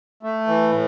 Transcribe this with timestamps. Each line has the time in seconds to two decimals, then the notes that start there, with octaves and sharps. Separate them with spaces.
0.23 A3
0.47 E3
0.72 A2